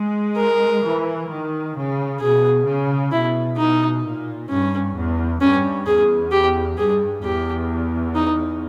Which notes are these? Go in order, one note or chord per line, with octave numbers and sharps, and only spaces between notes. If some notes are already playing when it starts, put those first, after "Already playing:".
Already playing: G#3
A#4
E3
D#3
C#3
B2 G#4
C#3
B2 E4
B2 D#4
A#2
G2 C#4
E2
G2 C#4
E2 G#4
G4
G2 G#4
E2 G4
D#4